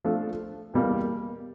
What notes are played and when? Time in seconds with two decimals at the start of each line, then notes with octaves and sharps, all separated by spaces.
0.04 F3 A3 D4 F4 A4
0.74 E2 B2 G3 A#3